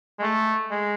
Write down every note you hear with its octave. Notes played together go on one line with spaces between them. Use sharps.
G#3
A3
G#3